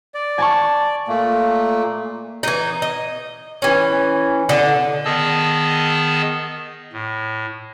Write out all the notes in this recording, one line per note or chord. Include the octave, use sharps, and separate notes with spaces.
D5
G#5 A5 C#6
A#2 A3 A#3
E3 D#4
D#5
E3 C#4
D3 A4 D#5
D#3 B3 G#4 D#5 A5 E6
A2